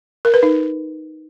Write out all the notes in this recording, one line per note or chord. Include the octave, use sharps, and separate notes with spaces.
A#4
B4
D#4